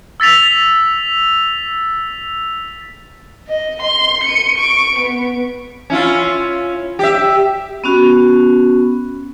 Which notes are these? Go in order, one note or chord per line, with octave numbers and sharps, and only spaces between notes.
E6 A6 B6 F7
D#5
C6
C#7 D#7
C#6 D7
B3
C#4 E4 F4
G4 E5
B3 C#4 F#4